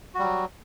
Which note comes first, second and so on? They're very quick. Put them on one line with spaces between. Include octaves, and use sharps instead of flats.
F#4 G3 F#3